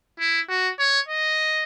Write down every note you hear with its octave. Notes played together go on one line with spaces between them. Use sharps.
E4
F#4
C#5
D#5